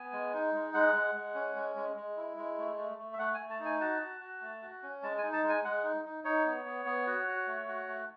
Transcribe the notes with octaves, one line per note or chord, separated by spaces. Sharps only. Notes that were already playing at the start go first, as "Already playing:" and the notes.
Already playing: B3 G#5
G#3
D#4
G#3
G#3 F#5
G#3
G#3
C#4
G#3
G#3
G#3
E4
G#3
A3
A3
A3
E5
A3 F#5
G#5
A3
A5
D#4
G#5
F#4 A5
F#4
F#4
A3
F#4
C#4
G#3 A5
G#5
D#4
A5
G#3
G#5
G#3 F#5
D#4
D#4
D#4 C#5
B3
B3
B3
F#4
F#4
A3
F#4
A3